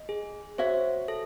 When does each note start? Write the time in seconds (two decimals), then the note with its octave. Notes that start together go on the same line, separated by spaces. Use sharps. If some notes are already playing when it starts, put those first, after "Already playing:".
Already playing: D#5
0.09 G#4
0.58 F#4 C5 C#5 E5
1.08 A4